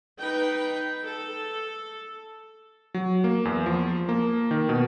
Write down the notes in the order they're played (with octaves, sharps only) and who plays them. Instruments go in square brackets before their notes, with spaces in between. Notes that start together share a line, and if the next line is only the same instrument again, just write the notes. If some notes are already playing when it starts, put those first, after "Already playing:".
[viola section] D#4 B4 G5
A4
[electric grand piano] F#3
A#3
E2
F3
A#3
D#3
B2